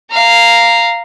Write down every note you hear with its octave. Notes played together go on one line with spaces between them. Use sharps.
F5 A#5